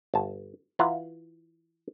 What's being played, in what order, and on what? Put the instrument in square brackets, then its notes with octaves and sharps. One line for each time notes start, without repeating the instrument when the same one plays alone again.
[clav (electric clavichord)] G1 A5
E3 E4 F4 F#5 A#5